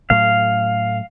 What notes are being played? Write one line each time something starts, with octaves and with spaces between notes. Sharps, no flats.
A2 F#3 A3 C#4 F5